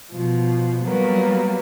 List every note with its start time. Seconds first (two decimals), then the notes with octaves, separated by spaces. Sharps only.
0.11 B2 F3
0.83 F#3 G3 A#3 B3